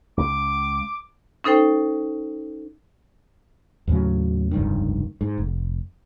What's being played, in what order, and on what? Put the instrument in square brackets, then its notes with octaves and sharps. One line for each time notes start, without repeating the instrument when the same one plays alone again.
[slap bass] C#2 [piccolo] D6
[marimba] C#4 D#4 A4 C5 G5
[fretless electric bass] D#2 A2 C#3 F#3
F1 C#2 G2 D#3
G#2
F1